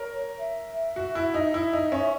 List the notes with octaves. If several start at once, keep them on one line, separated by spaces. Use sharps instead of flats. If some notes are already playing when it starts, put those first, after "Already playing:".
Already playing: A#4 C#5
E5
F#4
E4
D#4
E4 E5
D#4
C#4
E5